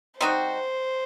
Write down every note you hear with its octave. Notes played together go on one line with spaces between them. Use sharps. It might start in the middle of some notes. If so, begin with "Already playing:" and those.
G3 C4 D#4 F#4 C5